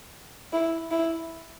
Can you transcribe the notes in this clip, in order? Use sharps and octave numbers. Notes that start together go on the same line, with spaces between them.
E4
E4